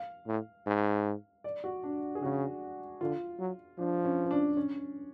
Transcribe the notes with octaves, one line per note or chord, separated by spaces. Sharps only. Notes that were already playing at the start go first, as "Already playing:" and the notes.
Already playing: F5
A2
G#2
D5
F#4
D4
G#4
C#3 F#4
D3 F4
F#3
F3 D4
C#4
C#4
D4
C#4